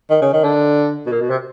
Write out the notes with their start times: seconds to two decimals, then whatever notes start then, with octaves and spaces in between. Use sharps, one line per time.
0.10 D#3
0.22 C#3
0.33 D#3
0.44 D3
1.06 B2
1.12 A#2
1.21 B2
1.30 C3